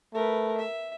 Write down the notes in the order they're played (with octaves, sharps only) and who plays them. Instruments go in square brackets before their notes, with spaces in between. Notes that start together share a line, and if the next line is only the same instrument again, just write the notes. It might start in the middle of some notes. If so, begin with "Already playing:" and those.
[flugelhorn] A3 [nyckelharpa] A#4 B4
[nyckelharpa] E5